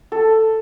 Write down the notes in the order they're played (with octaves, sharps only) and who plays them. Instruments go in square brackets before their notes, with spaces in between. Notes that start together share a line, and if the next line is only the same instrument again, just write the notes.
[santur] A4